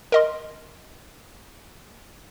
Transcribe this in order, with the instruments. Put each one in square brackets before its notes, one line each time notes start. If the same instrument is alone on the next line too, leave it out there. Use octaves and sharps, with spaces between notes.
[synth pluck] A#4 D#5 C6